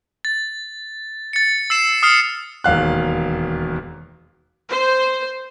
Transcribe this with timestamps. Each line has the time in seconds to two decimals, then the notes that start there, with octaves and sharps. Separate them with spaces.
0.25 A6
1.33 A6 C#7
1.70 E6 C7 E7
2.03 D#6 F6 C7 C#7
2.64 E1 D#2 F5 F#6
4.70 C5